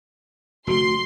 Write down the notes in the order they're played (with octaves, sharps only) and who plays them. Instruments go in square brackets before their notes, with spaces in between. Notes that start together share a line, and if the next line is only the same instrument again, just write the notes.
[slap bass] F1 D3 A3 [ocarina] F#4 [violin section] C6